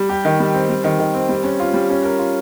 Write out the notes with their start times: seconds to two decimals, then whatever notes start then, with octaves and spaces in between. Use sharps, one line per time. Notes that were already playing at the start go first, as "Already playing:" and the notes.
Already playing: G3
0.09 G4
0.25 D#3
0.40 G3
0.54 C4
0.70 G3
0.84 D#3
0.99 D#3
1.14 C4
1.29 G3
1.44 C#4
1.60 F4
1.74 G3
1.90 C#4
2.04 A#4
2.19 F4